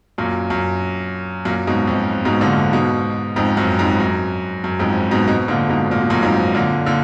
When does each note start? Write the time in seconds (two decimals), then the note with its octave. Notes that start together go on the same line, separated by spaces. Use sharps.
0.18 F#2 A#2
0.50 F#2
1.45 F#2 A#2
1.67 G#2 B2
1.88 F2
2.25 G#2 B2
2.41 A#2 D3
2.73 G#2 B2
3.36 F2 G#2
3.57 F#2
3.79 F2 G#2
4.00 F#2
4.64 F#2
4.79 F2 G#2
5.11 G#2 B2
5.27 G#2 B2
5.48 A#2 D3
5.69 G#2 B2
5.91 A#2
6.01 B2
6.10 F#2 A#2
6.23 F2 G#2
6.55 A#2 D3
6.86 A#2 D3